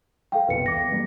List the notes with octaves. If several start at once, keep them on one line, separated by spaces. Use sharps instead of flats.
A4 F5 G5
F#1 C2 B2 B4 C#7
E2 D6 A#6
G3 A#3